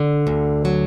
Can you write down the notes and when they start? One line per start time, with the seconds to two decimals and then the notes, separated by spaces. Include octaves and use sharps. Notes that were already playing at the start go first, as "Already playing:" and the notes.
Already playing: D3
0.27 D2
0.65 F#3